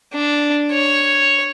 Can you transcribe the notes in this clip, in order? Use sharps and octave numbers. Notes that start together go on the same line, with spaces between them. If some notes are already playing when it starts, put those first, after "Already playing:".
D4
C#5